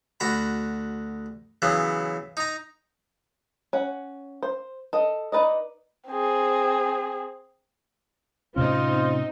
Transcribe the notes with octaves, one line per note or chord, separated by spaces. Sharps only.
D2 F#4 A#5 B5
C#3 E3 F#3 B3
D#4 A#5
C#4 F#5
C5
A4 D#5
D#4 B4 D5 D#5
C4 G#4
A2 C3 C4 C#4 D#4 F4